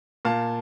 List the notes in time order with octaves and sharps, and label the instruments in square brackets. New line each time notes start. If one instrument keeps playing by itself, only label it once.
[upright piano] A#2 F5 A5